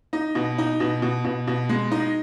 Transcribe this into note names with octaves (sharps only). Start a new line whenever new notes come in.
D#4
B2
D#4
B2
B2
B2
B2
G#3
D#4